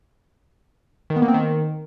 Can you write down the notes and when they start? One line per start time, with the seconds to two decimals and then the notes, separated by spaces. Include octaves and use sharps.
1.10 D#3
1.16 B3
1.22 A#3
1.28 C4
1.34 D#3